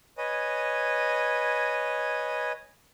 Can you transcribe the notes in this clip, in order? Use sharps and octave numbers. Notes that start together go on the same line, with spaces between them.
B4 C#5 D#5 G#5